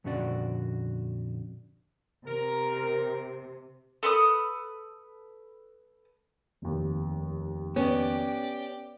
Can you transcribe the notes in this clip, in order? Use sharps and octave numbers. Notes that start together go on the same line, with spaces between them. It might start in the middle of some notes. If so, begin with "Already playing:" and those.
F2 A#2 D3 C#4 F#4 D5
C3 A#4
A4 B4 B5 D#6
F1 D#2
B3 C#4 G4 D5